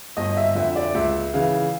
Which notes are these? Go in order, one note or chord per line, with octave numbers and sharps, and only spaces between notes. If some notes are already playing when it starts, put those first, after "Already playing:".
G1 D#5
E5
F2 D3 E5
D5
C#2 E5
C#3 E3 F5